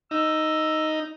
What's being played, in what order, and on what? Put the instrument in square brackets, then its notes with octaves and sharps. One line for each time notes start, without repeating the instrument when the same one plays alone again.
[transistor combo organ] D#4 [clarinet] E6